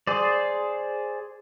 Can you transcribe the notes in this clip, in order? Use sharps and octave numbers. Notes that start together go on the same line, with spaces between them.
G#4 C5 D5